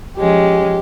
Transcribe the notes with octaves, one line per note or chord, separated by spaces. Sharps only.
F3 G#3 C#4 G4